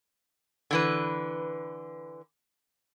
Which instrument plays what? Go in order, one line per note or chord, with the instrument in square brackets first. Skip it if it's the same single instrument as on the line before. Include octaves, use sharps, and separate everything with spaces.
[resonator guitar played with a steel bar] D3 E3 B4